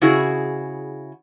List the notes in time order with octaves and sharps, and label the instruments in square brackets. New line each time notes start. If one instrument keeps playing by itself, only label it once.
[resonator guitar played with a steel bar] C#3 E4 F#4 G#4